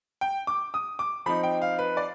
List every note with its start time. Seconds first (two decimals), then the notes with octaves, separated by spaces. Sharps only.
0.21 G5
0.47 D6
0.74 D#6
0.99 D6
1.26 F3 C4 D#4 B5
1.43 G5
1.62 F5
1.79 B4
1.97 D5